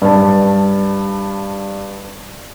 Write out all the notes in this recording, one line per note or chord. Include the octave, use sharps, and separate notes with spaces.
G2 A5